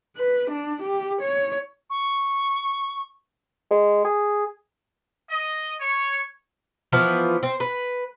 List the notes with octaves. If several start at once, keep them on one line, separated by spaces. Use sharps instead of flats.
B4
D4
G4
C#5
C#6
G#3
G#4
D#5
C#5
E3 F3 B3
C4
B4